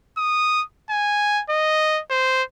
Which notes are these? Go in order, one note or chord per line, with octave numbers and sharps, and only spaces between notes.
D#6
G#5
D#5
C5